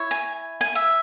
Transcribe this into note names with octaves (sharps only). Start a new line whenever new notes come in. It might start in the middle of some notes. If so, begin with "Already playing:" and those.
Already playing: E4 C#5
G#5
G#5
E5